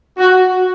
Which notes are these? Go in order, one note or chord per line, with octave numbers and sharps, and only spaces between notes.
F#4